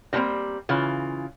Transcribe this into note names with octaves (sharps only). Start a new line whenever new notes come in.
D#3 F3 G3 A#3 C4
C#3 E3 F4